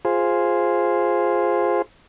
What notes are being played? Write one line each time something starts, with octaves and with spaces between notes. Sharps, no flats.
F4 G#4 C5